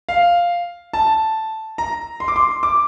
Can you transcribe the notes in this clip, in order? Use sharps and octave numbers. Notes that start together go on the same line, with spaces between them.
F5
A5
A#5
C6
D6
C6
D6